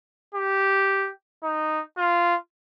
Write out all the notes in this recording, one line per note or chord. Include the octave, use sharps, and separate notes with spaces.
G4
D#4
F4